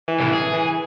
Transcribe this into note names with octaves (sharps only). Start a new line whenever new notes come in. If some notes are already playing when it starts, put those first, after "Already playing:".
E3
C2 A2
G#4
E3